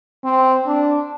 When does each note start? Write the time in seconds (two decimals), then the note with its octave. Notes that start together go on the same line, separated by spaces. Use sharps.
0.24 C4
0.66 D4